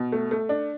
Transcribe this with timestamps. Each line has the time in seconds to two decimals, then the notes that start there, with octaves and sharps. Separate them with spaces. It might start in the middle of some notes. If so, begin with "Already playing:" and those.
Already playing: B2
0.12 A3
0.31 A3
0.49 D4